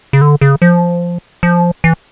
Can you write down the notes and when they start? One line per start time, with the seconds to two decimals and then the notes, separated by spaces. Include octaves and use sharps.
0.13 C#3
0.21 D3
0.41 C#3
0.62 F3
1.43 F3
1.84 E3